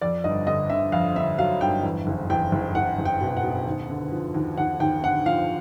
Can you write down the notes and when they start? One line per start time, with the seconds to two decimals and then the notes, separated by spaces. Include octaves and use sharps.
0.01 F2 D5
0.24 G1 D#5
0.47 D3 D#5
0.70 D3 E5
0.92 F2 F5
1.16 D3 E5
1.38 F#3 F5
1.61 G1 G5
1.83 E2
2.07 F#1
2.30 E2 G5
2.52 F#1
2.75 F#1 F#5
2.98 F#1
3.05 G5
3.21 B2
3.37 F#5
3.43 B2
3.67 D#2
3.90 D3
4.12 F3
4.34 D#2
4.57 D#2 F#5
4.80 D#2 G5
5.03 D3 F#5
5.26 F3 F5